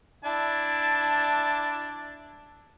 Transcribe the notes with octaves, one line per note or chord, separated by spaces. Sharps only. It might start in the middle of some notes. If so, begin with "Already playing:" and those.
D4 E4 A5